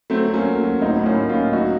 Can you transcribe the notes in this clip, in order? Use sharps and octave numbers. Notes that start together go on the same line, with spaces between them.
F#3 A3 C4
F#3
A#3 C#4
F#3
F#3
A2 C4 D#4
A2
A#3 C#4
A2
C#4 F4
A2
F#3 D#4 F#4